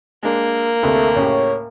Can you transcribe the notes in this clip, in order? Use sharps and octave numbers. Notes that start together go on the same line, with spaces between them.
G#3 A#3 D4
D2 C3 A3
A2 C#3 G4 C#5